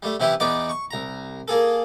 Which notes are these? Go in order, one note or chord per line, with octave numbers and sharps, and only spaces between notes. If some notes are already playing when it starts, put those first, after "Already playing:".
G3 A3
C3 E3 B3 E4 G4
E2 B3 D#4 D5 D6
C#6
C2 A#5
A#3 G#4 A4